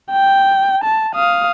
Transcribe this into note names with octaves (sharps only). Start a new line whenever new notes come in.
G5
A5
F5 D#6